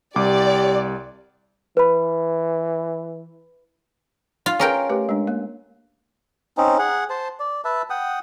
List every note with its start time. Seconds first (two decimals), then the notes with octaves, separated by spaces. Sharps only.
0.16 C2 G4 D5 D6
1.77 E3 B4 B5
4.46 F4
4.60 C#4 G#4 A#4 B4 G5
4.89 A3 G4 B4
5.09 G#3 D4
5.27 A#3
6.58 C4 C#4 D#4
6.79 G#4 F#5
7.10 C5 A5
7.40 D5
7.65 B4 E5 A5
7.90 F#5 G5 D#6